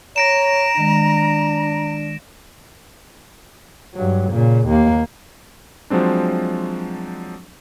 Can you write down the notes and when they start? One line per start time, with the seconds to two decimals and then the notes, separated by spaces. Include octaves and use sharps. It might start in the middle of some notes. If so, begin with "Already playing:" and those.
0.16 C#5 A#5 A#6 D7 E7
0.77 D#3 G#3 D4
3.95 G2 F#3
4.31 A#2 C#3
4.68 D#2 A#3
5.90 F3 F#3 G#3 C4 D4